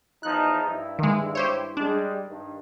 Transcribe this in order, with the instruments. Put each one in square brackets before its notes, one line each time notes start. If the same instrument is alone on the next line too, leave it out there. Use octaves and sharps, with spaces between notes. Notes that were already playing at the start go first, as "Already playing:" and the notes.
[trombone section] E2 F3 D#4 [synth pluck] F#6
[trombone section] G2 E4
[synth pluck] D#3 G#3
G4 C5 C#5
[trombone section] G3 G#3 [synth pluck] D4
[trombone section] G2 D#3